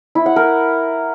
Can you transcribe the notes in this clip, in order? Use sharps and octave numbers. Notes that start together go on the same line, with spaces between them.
E4
F#5
A#4